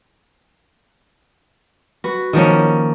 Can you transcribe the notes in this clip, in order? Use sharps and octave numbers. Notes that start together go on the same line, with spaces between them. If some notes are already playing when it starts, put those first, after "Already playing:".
F#4 B4
D#3 F3 A#3 C#4